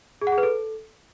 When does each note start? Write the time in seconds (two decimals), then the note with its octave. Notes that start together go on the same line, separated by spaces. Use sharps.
0.22 G#4
0.27 F#5
0.32 G#4
0.38 B4
0.43 A4